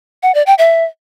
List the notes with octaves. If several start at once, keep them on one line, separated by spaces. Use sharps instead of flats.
F#5
D5
G5
E5